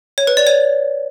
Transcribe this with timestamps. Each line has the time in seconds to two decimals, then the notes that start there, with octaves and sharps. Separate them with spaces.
0.18 C#5
0.27 B4
0.37 D5
0.47 C#5